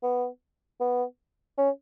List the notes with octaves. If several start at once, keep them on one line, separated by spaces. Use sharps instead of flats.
B3
B3
C#4